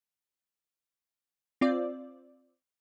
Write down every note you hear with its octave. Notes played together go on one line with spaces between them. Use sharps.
C4 F4 D5